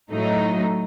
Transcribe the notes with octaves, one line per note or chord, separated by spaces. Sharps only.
A2 F#3 A3 D#4